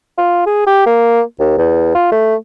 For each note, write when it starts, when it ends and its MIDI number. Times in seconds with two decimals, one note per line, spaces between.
0.18 0.45 65
0.46 0.62 68
0.66 0.86 67
0.86 1.21 58
1.40 1.56 39
1.58 1.91 40
1.95 2.09 65
2.12 2.35 57